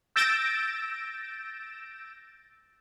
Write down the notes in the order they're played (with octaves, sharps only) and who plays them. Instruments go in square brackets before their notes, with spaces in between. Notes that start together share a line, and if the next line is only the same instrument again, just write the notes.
[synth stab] E6 G6 A6 A#6 D7 E7